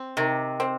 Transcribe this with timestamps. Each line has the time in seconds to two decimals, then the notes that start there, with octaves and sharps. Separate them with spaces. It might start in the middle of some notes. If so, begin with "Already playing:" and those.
Already playing: C4
0.17 C3 D#3
0.60 C4